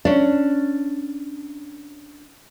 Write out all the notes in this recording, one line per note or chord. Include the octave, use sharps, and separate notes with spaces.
C#4 D4